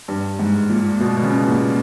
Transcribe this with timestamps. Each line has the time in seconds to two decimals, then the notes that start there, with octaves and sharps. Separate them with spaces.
0.08 G2
0.39 G#2
0.69 A#2
1.00 B2
1.17 B2
1.23 C#3
1.47 A#2